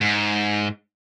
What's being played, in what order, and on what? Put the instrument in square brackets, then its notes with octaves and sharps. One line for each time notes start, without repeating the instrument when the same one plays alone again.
[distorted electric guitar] G#2